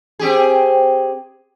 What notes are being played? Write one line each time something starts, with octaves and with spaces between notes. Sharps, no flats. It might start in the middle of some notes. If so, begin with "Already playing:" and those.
C4 G4 G#4